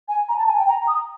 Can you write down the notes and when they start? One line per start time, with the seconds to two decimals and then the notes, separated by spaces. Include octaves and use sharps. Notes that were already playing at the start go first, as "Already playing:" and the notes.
0.08 G#5
0.29 A#5
0.38 A5
0.48 G#5
0.58 G5
0.68 A#5
0.88 D#6